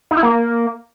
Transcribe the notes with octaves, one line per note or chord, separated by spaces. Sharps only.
D#4
E4
A#3